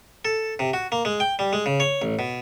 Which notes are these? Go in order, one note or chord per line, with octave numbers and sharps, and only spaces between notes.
A4
C3
F#4
A#3
G#3
G5
G3
G#3
C#3
C#5
A1
B2